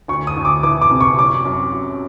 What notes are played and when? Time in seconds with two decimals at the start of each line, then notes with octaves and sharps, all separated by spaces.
0.08 D2 C#6
0.27 D#6
0.37 D2
0.45 D6
0.63 E3 D6
0.82 D6
0.91 C3
1.01 C#6
1.18 F#2 D6
1.45 F#2
1.73 F#3